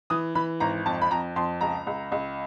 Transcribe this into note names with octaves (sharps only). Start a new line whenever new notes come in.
E3 D#6
E3 B5
G#1 A#5
F2 A5
B5
F2 A#5
F2 C6
C#2 A#5
C#2
C#2